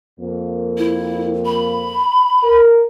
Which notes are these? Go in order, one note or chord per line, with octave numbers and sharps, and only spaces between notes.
F2 A#3
E4
B5
A#4